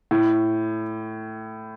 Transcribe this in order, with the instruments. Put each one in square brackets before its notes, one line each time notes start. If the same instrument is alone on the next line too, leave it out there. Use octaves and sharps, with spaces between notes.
[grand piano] A2